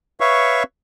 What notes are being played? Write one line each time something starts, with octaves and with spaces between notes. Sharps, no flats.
B4 C#5 E5 F5 C#6